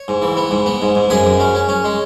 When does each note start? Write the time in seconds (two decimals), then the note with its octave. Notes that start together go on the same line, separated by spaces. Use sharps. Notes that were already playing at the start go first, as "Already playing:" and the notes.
Already playing: C#5
0.08 G#2
0.22 E3
0.37 B3
0.51 G#2
0.66 B3
0.82 G#2
0.95 G#2
1.10 F#2 G#4 B4
1.26 F#2
1.40 C#4
1.55 C#4
1.69 C#4
1.84 G#3